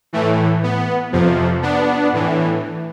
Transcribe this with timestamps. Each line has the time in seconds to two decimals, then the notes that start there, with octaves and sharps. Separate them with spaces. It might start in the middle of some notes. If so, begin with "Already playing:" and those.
0.13 A2 E3 A3
0.63 B3
1.12 F2 C3 F3
1.62 B3 D4
2.13 A2 E3